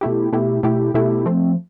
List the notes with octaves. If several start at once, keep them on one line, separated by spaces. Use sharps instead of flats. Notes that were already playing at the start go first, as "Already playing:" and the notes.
B2 A3 E4 G4
B2 A3 E4 G4
B2 A3 E4 G4
B2 A3 E4 G4
F3 A3 C4